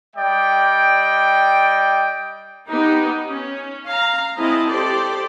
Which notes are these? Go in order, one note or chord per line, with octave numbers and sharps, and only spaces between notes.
G3 D5 D#5 G5
B3 D#4 G4
C#4
F5 A#5
G#3 C4 E4 D#5 A5
G4 A4 C5 D5